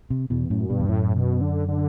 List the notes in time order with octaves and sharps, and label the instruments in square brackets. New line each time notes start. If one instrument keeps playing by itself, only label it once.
[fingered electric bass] C3
[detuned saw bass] E2 [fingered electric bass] B2
[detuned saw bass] F#2 [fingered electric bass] A2
[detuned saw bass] G2 [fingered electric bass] B2
[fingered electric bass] E2
[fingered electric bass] F#2 [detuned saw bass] A2
[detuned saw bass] B2
D3
D3